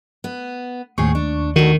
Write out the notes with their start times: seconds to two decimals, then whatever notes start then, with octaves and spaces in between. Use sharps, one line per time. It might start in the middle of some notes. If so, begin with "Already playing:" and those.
0.24 B3
0.98 D#2 A2 C4 G#4 C#6
1.15 D4
1.56 D2 D#3 F#4